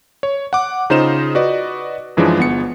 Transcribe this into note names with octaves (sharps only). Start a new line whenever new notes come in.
C#5
F#5 D6
C#3 D#4 F4 C5 D#5 E7
F#4 B4 D5 D#5
F#2 E3 F3 G#3 D4
G1 B3 C#7